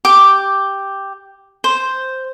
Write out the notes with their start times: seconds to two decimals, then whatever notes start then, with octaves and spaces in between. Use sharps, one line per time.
0.05 G4 D6
1.64 C5